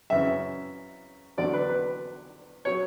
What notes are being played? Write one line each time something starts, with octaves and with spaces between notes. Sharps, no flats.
F#2 C#3 E3 E5
E2 D3 F#3 D5
B4
B4
F#3 C#5